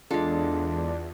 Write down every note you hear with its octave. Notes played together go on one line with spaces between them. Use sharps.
E2 G#3 D4 F4 A4